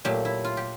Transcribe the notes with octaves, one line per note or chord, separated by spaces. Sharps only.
A#2 F#3 A3 G4
E4
F4
G4